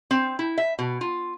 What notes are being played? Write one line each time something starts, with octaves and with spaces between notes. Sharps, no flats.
C4
E4
E5
B2
F4